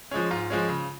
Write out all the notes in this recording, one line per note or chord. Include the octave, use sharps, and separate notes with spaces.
F3 G#3 C#4
G#2 F4
F3 G#3 C#4
C#3